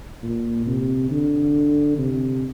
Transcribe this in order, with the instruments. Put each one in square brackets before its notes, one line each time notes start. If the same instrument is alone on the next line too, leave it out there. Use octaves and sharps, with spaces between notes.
[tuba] A#2
C3
D3
C3